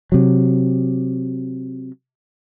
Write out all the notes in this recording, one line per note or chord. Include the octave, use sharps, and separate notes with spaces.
C3 F#3